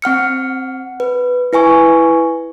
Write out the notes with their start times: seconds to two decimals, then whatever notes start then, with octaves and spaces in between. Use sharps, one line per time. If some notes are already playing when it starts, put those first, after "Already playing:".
0.02 C4 F#5 F6 C#7
1.00 B4
1.53 E4 B4 G#5 C#6